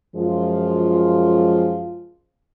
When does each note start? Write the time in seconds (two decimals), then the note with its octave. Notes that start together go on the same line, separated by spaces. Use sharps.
0.16 F#2 F3 G#3 F4